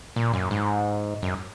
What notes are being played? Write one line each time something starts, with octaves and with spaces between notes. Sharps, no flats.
A#2
F#2
G#2
F#2